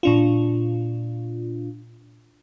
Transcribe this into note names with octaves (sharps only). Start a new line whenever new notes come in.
A#2 D4 F4